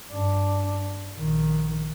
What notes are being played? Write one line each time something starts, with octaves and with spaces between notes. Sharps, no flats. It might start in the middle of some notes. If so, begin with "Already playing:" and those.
G2 D4
A#1 D#3